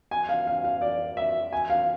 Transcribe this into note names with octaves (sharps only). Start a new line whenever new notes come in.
G#5
F5
F5
F5
D5
E5
G#5
F5